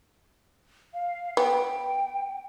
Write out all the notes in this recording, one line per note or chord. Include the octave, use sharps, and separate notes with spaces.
F5
B3 G5